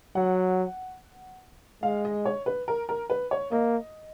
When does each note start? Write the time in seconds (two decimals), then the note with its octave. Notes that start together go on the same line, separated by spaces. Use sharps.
0.15 F#3 F#5
1.83 G#3 F5
2.05 D#5
2.26 C#5
2.46 B4
2.68 A#4
2.89 A#4
3.10 B4
3.31 C#5
3.51 A#3 D#5